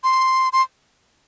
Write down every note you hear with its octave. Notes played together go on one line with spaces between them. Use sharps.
C6
C6